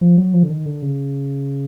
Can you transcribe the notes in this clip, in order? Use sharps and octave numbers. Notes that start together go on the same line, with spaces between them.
F3
F#3
F3
D3
D#3
D3
C#3